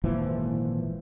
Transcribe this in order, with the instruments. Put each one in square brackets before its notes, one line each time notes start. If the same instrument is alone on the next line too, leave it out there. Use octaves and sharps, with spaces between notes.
[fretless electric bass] G#1 A#2 E3 F3